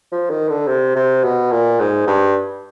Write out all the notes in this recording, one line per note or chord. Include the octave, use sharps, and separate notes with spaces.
F3
D#3
D3
C3
C3
B2
A#2
G#2
G2